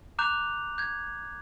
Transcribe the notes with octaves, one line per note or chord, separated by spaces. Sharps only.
A#5 D6 F#6 G6 F7
G6 G#6